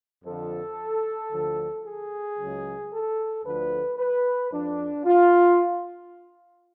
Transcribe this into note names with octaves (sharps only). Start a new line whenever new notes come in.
F2 D3 F3 A4
D2 D3 F3
G#4
C#2 C#3 F#3
A4
D2 D3 F3 B4
B4
F2 F3 D4
F4